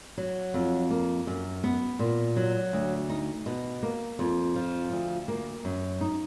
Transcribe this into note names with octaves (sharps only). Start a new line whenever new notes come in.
F#3
F2
A#3
F#2
B3
A#2
F#3
D2
D#4
B2
A#3
F2
F3
D2
A#3
F#2
D#4